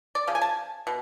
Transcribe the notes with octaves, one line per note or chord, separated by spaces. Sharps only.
D5
C#3 F3
G#5
A5
B2